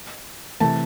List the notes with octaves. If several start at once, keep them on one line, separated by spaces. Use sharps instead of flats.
C3 E3 A3 A5